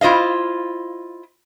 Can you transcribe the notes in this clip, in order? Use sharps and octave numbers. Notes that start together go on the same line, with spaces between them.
E4 F4 C5 D#5 F5